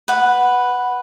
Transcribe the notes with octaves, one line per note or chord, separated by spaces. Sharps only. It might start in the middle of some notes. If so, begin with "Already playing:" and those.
B4 F#5